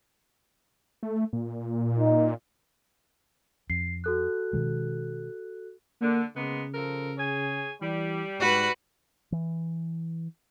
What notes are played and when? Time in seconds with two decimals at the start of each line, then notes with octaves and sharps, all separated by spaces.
1.03 A3
1.33 A#2
1.99 D#4
3.70 F2 C7
4.04 F#4 A4 F#6
4.53 B2 D#3 G#3
6.01 D3 A#3
6.36 C#3 G#3 A#3 B3
6.74 F3 A4 A#4
7.17 G#4 C#5 G#5
7.81 E3 G3
8.40 G#2 F#4 B4
9.32 E3